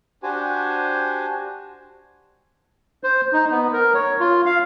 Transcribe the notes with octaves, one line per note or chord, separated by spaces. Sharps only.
D4 F#4 G4 C5 G#5
C5
D#4
B3
A#4
C#5
F4
F5